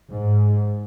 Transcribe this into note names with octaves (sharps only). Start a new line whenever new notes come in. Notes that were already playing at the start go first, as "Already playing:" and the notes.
G#2